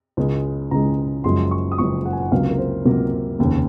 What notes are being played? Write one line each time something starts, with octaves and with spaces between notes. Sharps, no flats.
C#2 C#3 G#3
C#2 C#3 G#3 A#5
F#1 F#2 F3 G#3 C6
C#6
D#6
F#1 F#2 F3 G#3 C#6
F#5
G#5
F#5
C#2 C3 F#3 A#3 F5
A#4
C5
C#2 C3 F#3 A#3 A#4
F1 D#2 C#3